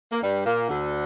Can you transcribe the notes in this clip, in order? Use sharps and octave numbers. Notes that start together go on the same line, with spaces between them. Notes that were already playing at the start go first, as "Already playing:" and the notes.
A#3
G2 G3
A#2 A#3
D2 D3